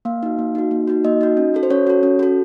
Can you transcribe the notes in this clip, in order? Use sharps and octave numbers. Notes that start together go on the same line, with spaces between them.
A#3 F5
D#4 F#4
A#3
D#4 F#4
A#3
D#4 F#4
A#3 D#5
D#4 F#4
C#4
F#4 A4
C5
C#4 C#5
F#4 A4
C#4
F#4 A4